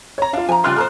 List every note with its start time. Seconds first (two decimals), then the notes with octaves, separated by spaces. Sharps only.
0.18 C#5 A#5
0.33 D4 F4 F5
0.49 F3 G#5 A#5
0.64 C#3 G3 F4 C6 F6 F#6
0.76 A#2 F3 A4 C5